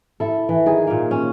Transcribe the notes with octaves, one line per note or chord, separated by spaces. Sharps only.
E4 A4
E3
D#3 G#4
A#2 A#3
C#4